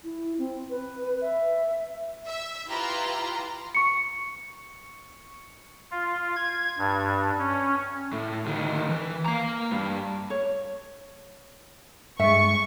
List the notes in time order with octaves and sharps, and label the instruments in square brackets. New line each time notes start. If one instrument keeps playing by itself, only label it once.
[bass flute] E4
C4
B4
E5
[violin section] E5
E4 F4 G4 B4 A#5 C6
[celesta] C#6 C#7
[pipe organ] F4
G#6
G2
C#4
[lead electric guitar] A2
D2 D#3
E3
A#3 A#5
G2
[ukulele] C#5
[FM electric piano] G2 G#3 [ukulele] E5 [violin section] C#6